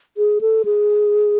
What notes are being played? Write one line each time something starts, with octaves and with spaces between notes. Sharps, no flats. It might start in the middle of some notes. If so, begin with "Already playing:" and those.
G#4
A4
G#4